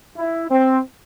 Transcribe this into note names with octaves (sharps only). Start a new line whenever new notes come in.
E4
C4